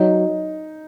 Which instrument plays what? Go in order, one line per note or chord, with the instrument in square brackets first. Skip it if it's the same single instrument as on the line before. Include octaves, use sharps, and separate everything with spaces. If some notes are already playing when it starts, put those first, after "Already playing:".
Already playing: [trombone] F#3 [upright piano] D#4